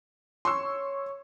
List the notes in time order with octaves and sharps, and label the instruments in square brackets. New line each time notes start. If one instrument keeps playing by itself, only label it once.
[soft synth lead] C#5 [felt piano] C6 C#6 E6